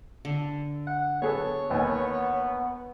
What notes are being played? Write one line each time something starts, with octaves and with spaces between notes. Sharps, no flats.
D3
F#5
B3 G#4 A4 C#5
D#2 B3 G#5